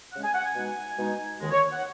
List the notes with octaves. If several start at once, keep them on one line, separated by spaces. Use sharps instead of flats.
C#3 G#3 C#4 F#5
G#5
F#5
G#5
B2 G#3 D#4
B2 G#3 D#4
D#2 D#3 G#3
C#5
F#5